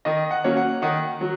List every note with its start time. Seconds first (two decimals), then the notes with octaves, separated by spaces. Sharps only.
0.05 D#3 D#5
0.31 F#5
0.44 F#3 A#3 C#4
0.57 F#5
0.82 D#3 F#5
1.21 F#3